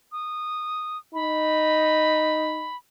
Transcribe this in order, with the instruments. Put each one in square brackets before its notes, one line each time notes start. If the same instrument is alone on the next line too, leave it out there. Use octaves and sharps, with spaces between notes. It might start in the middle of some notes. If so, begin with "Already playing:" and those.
[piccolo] D#6
[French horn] D#4 [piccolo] B5